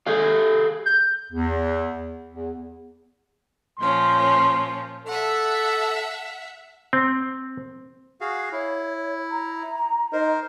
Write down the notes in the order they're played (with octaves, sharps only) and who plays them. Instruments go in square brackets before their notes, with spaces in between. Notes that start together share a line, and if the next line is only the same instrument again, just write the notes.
[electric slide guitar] G#4 A4 F5
[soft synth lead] G6
[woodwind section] E2
E2
[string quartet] A#2 F3 C#4 [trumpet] C6
[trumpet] A4 [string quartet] E5 F#5
[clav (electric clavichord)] C4
[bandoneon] F#4 G#4 F5
[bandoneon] E4 [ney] C#5
[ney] A#5
[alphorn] D#4 [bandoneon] A#4 C5